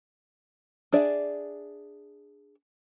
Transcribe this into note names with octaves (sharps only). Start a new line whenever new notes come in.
D4 G#4 D5 E5